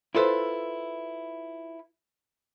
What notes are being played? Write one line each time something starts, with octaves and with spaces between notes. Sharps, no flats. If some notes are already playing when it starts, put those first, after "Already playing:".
E4 F4 A4 B4 C5